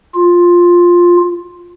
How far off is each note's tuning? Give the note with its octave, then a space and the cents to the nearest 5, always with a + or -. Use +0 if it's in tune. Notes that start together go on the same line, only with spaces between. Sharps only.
F4 +5